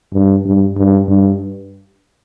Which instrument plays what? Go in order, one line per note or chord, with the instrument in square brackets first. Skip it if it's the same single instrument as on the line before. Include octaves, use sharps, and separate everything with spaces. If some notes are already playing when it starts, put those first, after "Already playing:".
[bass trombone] G2
G2
G2
G2